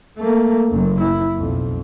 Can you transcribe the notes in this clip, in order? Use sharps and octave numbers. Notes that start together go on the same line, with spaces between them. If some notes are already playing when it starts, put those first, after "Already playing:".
A3 A#3
F#1 F#2
E4
B1 F2